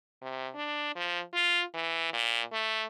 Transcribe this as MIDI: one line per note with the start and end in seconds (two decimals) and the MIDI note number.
0.22 0.49 48
0.55 0.93 62
0.96 1.21 53
1.34 1.63 65
1.74 2.09 52
2.13 2.42 46
2.53 2.86 57